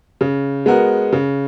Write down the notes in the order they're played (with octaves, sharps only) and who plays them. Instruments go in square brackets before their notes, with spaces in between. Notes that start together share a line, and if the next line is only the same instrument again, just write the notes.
[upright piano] C#3
G#3 B3 F#4 A#4
C#3